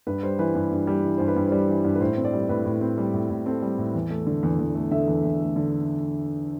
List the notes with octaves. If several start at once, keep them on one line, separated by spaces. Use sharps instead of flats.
G2 B4
G3 C5
E3 B4
G2
G2
G3
E3
G2 C5
B4
G2
C5
G3 D5
E3
G2
B4
A2 C5
C4
D5
G3
A2 B4
A2
C4
G3
A2
A2
C4 A4
G3
A2
E2
A3
D3
E2
E2
A3
D3 E5
E2
E2
A3
D3